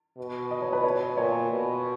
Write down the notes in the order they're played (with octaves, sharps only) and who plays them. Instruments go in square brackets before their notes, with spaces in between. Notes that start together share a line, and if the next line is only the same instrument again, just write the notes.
[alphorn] B2
[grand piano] D#5
C#5
B4
C#5
[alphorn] A#2 [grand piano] C#5
[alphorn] B2